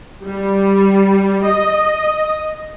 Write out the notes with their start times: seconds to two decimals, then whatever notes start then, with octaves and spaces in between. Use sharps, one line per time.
0.24 G3
1.45 D#5